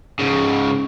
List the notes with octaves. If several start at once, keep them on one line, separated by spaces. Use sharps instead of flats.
G#2 C#3